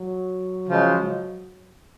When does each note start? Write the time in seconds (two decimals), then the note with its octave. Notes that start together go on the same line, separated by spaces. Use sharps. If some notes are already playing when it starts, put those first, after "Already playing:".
Already playing: F#3
0.68 C#3 F3 G#3